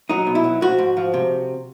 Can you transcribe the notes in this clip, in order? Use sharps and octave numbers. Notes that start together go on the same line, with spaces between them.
F#3 D#4
B2
E4
F#3
F3 F#4
G#2
F3
C3